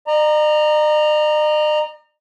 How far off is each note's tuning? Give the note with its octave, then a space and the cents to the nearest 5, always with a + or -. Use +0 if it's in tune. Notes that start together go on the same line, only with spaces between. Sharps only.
D#5 -45 A#5 +0